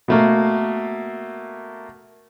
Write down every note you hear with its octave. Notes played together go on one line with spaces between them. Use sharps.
B2 A3 A#3